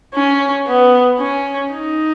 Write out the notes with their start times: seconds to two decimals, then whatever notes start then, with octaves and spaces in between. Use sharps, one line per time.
0.14 C#4
0.67 B3
1.19 C#4
1.72 D#4